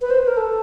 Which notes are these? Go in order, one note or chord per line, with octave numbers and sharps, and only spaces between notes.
B4
C5
B4
A#4
A4